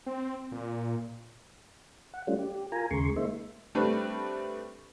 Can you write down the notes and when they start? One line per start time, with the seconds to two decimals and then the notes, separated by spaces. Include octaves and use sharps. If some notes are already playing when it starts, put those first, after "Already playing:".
0.06 C4
0.52 A#2
2.14 F#5
2.27 G3 A3 C#4 D4 F4
2.39 G4
2.72 F4 A#4 G#5 A#5
2.91 D#2 C#3 G#3 C6 C#6
3.16 G#3 A#3 D#4 C5 E5
3.75 G3 A3 C4 D4 B4